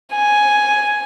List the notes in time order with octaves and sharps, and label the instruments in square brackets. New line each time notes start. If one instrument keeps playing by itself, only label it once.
[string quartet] G#5